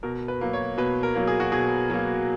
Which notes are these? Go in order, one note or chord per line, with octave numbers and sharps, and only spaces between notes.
B2 A#4
B4
F#3 A#3
C#5
B2 B4
A#4
F#3 A#3
G#4
F#4
B2 G#4
F#3 A#3